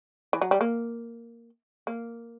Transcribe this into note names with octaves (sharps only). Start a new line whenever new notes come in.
E3
F#3
G3
A#3
A#3